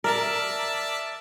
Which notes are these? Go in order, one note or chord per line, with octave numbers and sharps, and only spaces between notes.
A#4 D5 E5 A5